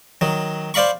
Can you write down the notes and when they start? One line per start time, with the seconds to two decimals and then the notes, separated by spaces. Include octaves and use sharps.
0.21 D#3 F#3
0.74 C5 D5 F5 B5 C#6